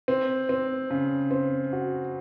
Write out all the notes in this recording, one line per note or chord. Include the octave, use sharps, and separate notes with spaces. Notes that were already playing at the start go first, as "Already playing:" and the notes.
C4
C4
C#3
C4
F#4